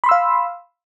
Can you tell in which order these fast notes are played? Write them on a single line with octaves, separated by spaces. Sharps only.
B5 C6 E6 F5